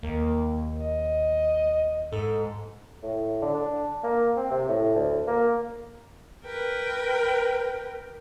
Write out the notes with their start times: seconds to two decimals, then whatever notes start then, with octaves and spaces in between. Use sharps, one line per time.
0.03 D#2 A#3
0.80 D#5
2.12 G#2 A4
3.03 A2
3.42 D3
3.54 D4
4.03 A#3
4.37 C4
4.51 C3
4.69 A2
4.95 D2
5.27 A#3
6.44 A#4 B4 G5